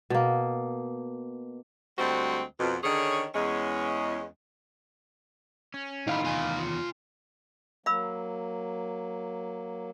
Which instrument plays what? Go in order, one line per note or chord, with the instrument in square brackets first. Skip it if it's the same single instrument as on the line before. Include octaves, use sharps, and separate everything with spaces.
[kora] B2 A#3
[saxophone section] D2 G3 G#3 C4 F#4 C5
F2 B2
D3 D#3 C#4 G#4 C#5
E2 G#3 C#4
[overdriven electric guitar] C#4
[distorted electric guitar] A2 D#3 [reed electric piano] D#4 F5 B5 [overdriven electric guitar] F4
[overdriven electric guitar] E2 D#3 [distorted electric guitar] F4 G#5
[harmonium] F#3 A#3 [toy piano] F5 B5 E6